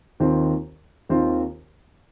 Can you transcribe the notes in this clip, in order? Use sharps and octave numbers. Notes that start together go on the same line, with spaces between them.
D#2 D#3 C4 F4
D#2 D#3 C4 F4